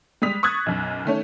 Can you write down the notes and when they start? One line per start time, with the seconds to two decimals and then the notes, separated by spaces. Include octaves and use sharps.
0.22 G3 G#3 D#6 B6 F7
0.43 C#6 D#6 E6 F#6 G#6 A6
0.66 B1 F#2
1.05 D#3 A3 C#4